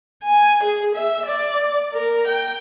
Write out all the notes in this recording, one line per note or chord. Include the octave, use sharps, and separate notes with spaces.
G#5
G#4
E5
D5
A#4
G5